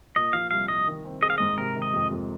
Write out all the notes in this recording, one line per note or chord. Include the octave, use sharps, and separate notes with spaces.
A#2 D#5
F3 F5
C2 F5
C2 D#5
D#3
C4
G#4 D#5
F5
G#2 D#5
C3 A#4
D#3
D#5
F2
F2